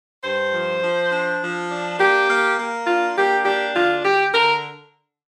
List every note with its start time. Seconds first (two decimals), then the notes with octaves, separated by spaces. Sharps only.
0.24 G2 C5
0.53 F3
0.82 F3
1.11 D4
1.41 F3
1.70 D4
1.99 A#3 G4
2.28 A#3
2.57 A#3
2.86 D4 F4
3.16 A#3 G4
3.45 D4 G4
3.74 D2 F4
4.03 D2 G4
4.33 D3 A#4